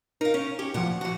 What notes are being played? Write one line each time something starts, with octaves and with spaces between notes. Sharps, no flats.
D#4 A#4 F5
C#4
C#4 G4
D2 A#2 F3 F#5
E3 F#4